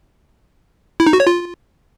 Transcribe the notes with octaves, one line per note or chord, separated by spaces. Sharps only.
E4
D#4
F#4
C#5
F4